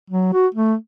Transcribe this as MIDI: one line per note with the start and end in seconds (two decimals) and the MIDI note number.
0.10 0.29 54
0.33 0.47 66
0.54 0.74 57